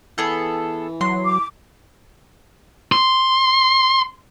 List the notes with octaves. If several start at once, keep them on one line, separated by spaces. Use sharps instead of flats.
E3 B3 G#4 A4
F#3 C6
D6
C6